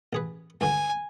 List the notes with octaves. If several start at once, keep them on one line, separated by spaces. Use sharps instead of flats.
A1 G#4 B4
C#2 G2 D3 G#5